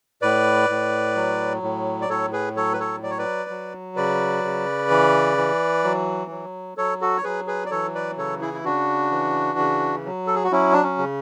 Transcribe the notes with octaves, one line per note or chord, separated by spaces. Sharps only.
A2 B4 D5
A2
F#3
A2
D5
A2 A4 C#5
G#4 B4
F#3 A4 C#5
B4
A4 C#5
F#3 D5
C#5
B4 D5
F#3
C#3 B4 D5
C#3
E3
E3
F#3
F#3
F#3 A4 C#5
F#4 A4
C#5
F#3 G#4 B4
G#4 B4
D5
E3 A4 C#5
B4 D5
C#3 A4 C#5
E4 G#4
E4
C#3 D4 F#4
E3
C#3
F#3
A4
G#4
F#4
F#3 C#4 E4
D4
C#4
C#3